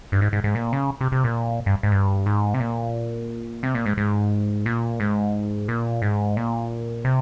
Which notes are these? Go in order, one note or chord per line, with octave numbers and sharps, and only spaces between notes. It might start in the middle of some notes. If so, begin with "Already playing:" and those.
G2
G#2
G#2
G#2
A#2
C#3
C3
C3
A#2
G2
G#2
G2
G#2
C3
A#2
C3
A#2
G#2
G#2
A#2
G#2
A#2
G#2
A#2
C3